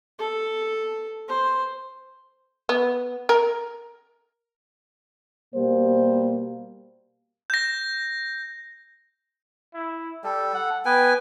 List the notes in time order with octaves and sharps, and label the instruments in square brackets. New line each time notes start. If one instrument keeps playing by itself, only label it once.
[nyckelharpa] A4
C5
[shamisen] B3
A#4
[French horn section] B2 G3 A#3 [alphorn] C5
[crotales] G6 A#6
[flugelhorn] E4
[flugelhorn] G3 [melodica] A4
[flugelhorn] F#5
[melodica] B3 B4 G#5 [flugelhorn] G5